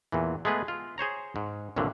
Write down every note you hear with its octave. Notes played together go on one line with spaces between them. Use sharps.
E2 A#2 E3
G#3 A3 B3 G#4 B4
F4
G#4 C5 C#5 A#5
G#2
C2 G2 A#2 D3 F#3